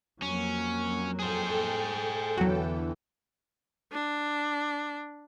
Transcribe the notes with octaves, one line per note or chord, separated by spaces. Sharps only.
F2 F#3 A#3 C#4
G#4 A4 C5 G5
E2 D3 E3 F#3 F#4
D4